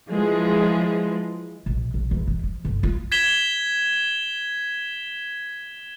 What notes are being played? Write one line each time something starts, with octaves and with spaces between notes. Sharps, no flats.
E3 F3 G#3
A#1
A#1
E2
G#2
F3
G1
F4
G#6 B6 E7 G7